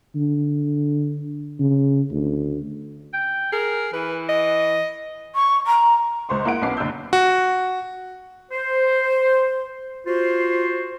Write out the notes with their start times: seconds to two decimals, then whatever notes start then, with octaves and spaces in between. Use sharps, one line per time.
0.15 D3
1.60 C#3
2.11 D2
3.13 G5
3.52 G#4 A#4
3.94 E3 B4
4.29 D#5
5.35 C#6
5.66 A#5
6.29 C#2 C5 C6 C#6
6.45 A#3 E4 F#5 D7
6.62 B1 B3 C#4 D6 C7
6.77 F#1 D3 E6 G6
7.13 F#4
8.52 C5
10.07 F4 F#4 C5